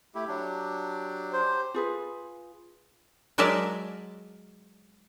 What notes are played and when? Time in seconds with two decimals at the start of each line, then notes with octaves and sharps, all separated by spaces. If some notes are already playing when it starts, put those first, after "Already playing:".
0.15 A3 E4 G4
0.28 F#3 D4
1.33 C5
1.74 F4 G#4 B4
3.38 F#3 G#3 A#4 D5 E5 A5